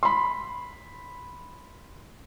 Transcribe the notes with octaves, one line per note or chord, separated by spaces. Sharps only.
B5 C6